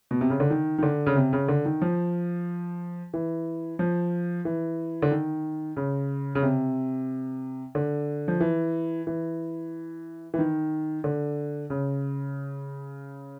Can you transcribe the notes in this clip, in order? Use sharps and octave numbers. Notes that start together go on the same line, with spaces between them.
B2
C3
C#3
D3
D#3
D#3
D3
C#3
C3
C#3
D3
D#3
F3
E3
F3
E3
D3
D#3
C#3
C#3
C3
D3
F3
E3
E3
E3
D#3
D3
C#3